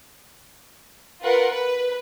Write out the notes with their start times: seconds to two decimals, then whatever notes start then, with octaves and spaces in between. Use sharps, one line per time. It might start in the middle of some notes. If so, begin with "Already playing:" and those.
1.22 F4 A#4 B4 F#5
1.51 B4